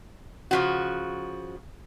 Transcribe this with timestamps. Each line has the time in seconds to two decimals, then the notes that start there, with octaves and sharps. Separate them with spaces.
0.51 C#3 F3 F#4